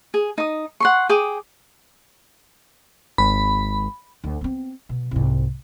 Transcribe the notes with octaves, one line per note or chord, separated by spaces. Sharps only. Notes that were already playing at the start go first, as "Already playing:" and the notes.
G#4
D#4 D#6
F#5 C6 C#6
G#4 G5 D6 D#6
G#1 B5
D2
B3 C4
B2
C2 G#2